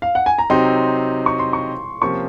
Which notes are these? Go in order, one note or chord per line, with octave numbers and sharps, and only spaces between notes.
F5
F#5
G#5
A#5
C3 F#3 C4 D#4 C6
C#6
C6
C#6
C3 F3 A#3 C#4 C#6